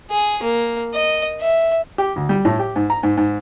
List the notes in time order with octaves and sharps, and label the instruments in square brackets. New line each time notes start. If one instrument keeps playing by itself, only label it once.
[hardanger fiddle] G#4
A#3
D#5
E5
[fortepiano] G4
D2
G3
A2
G4
G#2
A#5
G#2
G#2